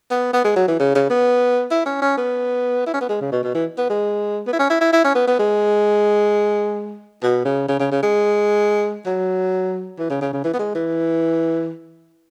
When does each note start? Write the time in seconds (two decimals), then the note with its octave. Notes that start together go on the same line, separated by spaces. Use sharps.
0.11 B3
0.33 B3
0.45 G#3
0.56 F#3
0.68 E3
0.79 C#3
0.95 C#3
1.10 B3
1.71 E4
1.86 C#4
2.02 C#4
2.18 B3
2.86 E4
2.94 C#4
3.01 B3
3.09 G#3
3.21 C#3
3.32 B2
3.43 B2
3.55 E3
3.78 B3
3.89 G#3
4.47 B3
4.53 E4
4.59 C#4
4.70 E4
4.81 E4
4.93 E4
5.04 C#4
5.15 B3
5.27 B3
5.39 G#3
7.23 B2
7.45 C#3
7.68 C#3
7.79 C#3
7.92 C#3
8.03 G#3
9.06 F#3
9.98 E3
10.10 C#3
10.21 C#3
10.33 C#3
10.44 E3
10.53 B3
10.59 G#3
10.75 E3